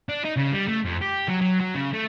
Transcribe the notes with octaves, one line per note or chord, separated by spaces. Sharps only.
D4
D#4
C#3
G3
A3
F2
G4
F#3
F#3
F#3
C#3
A3